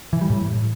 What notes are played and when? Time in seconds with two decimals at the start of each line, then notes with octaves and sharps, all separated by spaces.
0.13 E3
0.21 G3
0.30 A2